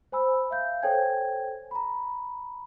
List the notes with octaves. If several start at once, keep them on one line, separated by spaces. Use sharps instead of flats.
C5 G#5 B5 E6
E5 F5 G6
A4 C5 C#5 G5 G#5 G#6
A#5 B5